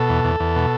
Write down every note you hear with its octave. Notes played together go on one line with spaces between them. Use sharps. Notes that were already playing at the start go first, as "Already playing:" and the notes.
Already playing: B2 A4
E2
E2
E2
B2